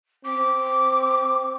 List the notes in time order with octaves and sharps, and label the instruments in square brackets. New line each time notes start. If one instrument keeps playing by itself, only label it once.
[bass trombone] C4 [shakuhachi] D6